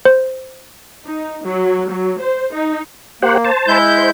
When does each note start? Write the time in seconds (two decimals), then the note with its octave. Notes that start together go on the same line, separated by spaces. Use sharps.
0.05 C5
1.05 D#4
1.43 F#3
1.89 F#3
2.19 C5
2.53 D#4
3.22 A#3 G4 C5 F#5
3.45 C5 A5
3.68 G#3 E4 G6
3.98 C5